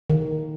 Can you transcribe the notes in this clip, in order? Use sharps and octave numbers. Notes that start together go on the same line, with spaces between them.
D#3